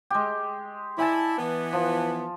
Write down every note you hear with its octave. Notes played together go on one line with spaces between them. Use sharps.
G#3 G4
E4 D5 G#5 A5
E3 B3
F3